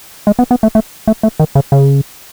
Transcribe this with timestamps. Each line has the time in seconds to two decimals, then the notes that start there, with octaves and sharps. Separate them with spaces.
0.27 G#3
0.39 B3
0.51 B3
0.63 A3
0.75 A3
1.07 A3
1.23 A3
1.40 D#3
1.55 C#3
1.72 C#3